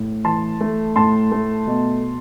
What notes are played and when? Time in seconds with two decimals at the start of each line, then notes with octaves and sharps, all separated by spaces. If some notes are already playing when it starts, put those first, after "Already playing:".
Already playing: A2
0.24 E3 A5 C6
0.61 A3
0.96 A2 A5 C6
1.32 A3
1.67 B2